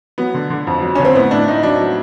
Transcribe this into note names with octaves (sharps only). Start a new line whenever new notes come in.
F#3 B3
D3
D3
F2
F#3
D3 C#4
C4
A2 B3
A2 D4
A2 D#4
F#3 D4
F#3